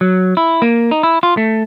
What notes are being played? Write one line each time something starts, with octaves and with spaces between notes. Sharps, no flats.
F#3
E4
A#3
D#4
E4
F4
A3